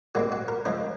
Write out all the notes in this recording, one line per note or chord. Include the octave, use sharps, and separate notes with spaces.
C2 A#2 G#3 C4 F#4
F#4
A#4
C#2 C#3 F3 G#3 C5